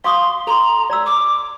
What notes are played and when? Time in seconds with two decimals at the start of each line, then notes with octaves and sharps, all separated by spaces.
0.04 F5 C6 C#6 D#6
0.47 A4 A#5 C6
0.90 D5 A#5 E6
1.06 D6